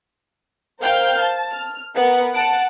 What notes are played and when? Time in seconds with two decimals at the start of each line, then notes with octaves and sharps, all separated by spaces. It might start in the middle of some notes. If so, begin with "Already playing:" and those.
0.81 A#4 C5 F5 G5 F6 G6
1.20 A5
1.53 F6
1.95 B3 A#4 F#5
2.34 F#5 A5 D7